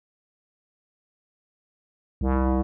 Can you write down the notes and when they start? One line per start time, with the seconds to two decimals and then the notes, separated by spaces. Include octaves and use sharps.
2.21 C2